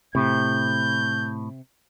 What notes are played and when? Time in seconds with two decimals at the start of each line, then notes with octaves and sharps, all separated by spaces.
0.15 A2 C3 G6